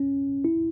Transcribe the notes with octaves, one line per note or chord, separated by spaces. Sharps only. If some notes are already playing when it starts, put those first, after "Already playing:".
Already playing: C#4
E4